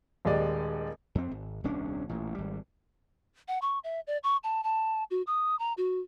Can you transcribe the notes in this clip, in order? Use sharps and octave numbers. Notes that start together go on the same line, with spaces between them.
D#1 D#2 G#3 G4 D5 D#5
F2 C4
G#1
D#1 C2 C#4 D4
A1 A#2
G#1 G3
F#5
C#6
E5
D5
C#6
A5
A5
F#4
D#6
A#5
F#4